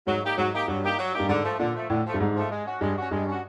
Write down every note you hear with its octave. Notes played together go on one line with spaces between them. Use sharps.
G#2 F#3
A#3 D#4 G4
G#2 F#3
A#3 D#4 G4
G2 F#3
A#3 D#4 G4
F#3
A#3 D#4 G4
G2
G#2 D3
F3 A3
A#2 D3
F3 A3
A2 D3
F3 A3
G2
G#2 D3
F3 A3
G#3
C#4 F#4
G2 G#3
C#4 F#4
G2 G#3
C#4 F#4